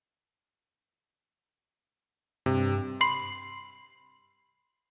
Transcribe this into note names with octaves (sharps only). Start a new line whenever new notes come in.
G2 C3
B5 C6 C7 F#7